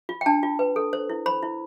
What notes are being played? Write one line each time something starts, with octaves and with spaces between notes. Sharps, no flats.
F4
G5
D4 A5
F4
B4
A4
C5
E4
C5 B5
E4